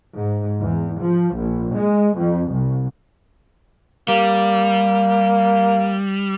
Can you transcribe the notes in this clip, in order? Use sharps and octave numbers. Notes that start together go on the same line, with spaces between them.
G#2
E2
F3
A#1
G#3
F2
C2
G3 A#3